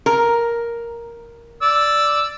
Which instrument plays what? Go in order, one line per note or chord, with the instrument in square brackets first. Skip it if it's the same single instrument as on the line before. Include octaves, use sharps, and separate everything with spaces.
[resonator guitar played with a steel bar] A#4
[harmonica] D5 E6